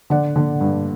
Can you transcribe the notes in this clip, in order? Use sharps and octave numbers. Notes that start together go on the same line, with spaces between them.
D3 D5 F#5
D3
G2